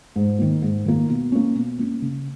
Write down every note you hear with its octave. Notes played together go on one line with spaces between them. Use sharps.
G#2
D#3 A#3
G#2
D#3 A#3
B2
A#3 C#4
B2
A#3 C#4
C#3